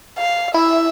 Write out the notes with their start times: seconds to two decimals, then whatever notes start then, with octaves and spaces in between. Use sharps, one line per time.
0.18 F5
0.54 E4 E5